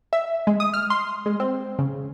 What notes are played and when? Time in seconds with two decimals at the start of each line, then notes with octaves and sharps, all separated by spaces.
0.13 E5
0.47 G#3
0.60 D#6
0.74 F6
0.90 C6
1.26 G#3
1.40 C4
1.79 C#3